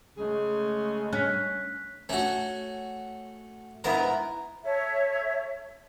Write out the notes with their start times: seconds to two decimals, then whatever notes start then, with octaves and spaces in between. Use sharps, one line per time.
0.18 C#3 G#3 A3 G#4
1.13 C#4 F#6 B6
2.09 A3 C#4 F#4
3.84 G#2 B3 E4 A#4
4.63 A4 C#5 E5